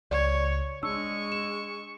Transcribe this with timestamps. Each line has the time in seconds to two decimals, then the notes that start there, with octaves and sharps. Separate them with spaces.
0.11 C#2 C#5 D5
0.83 G#3 D4 C#6 E6
1.32 E7